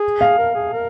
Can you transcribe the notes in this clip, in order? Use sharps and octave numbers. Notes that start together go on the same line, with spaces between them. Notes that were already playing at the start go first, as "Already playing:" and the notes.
Already playing: G#4
F5
A#4
G#4
A#4